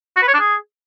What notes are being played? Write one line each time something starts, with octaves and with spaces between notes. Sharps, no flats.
F#4
B4
C#5
D4
G#4